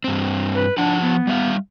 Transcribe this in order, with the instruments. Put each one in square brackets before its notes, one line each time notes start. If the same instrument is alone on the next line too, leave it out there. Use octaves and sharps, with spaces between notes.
[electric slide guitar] G2 C4
[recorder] B4
[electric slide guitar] F3 F#5 A5 [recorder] D4
[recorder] B3
[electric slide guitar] G3 E5 F5